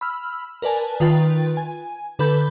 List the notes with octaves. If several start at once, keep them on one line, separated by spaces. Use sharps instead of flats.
B5 E6 F6
A#4 B4 D5 G#5 A5
D#3 F4 B4 G5 A6
G#5
D3 A4 B4 B5 G6